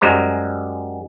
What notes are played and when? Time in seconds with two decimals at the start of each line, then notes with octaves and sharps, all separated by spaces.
0.01 F#2 G3 G#3 C5 A#5